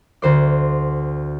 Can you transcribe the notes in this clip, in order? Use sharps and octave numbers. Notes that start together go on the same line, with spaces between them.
D2 C5 D5